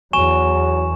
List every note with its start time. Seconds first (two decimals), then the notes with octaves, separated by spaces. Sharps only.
0.13 E2 F#3 G#5 C#6 E7